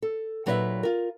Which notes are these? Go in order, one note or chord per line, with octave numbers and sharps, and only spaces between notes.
A4
A#2 F#3 D#4 B4 D5 E5
F4 A#4